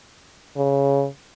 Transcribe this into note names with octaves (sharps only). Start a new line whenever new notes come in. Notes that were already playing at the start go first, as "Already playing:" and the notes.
C#3